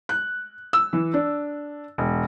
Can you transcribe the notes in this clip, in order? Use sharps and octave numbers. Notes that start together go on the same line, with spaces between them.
F#6
E6
E3
D4
E1